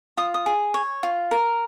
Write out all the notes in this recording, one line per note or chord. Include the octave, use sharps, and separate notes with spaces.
F4 D#6
D#6
G#4
C#5
F4
A#4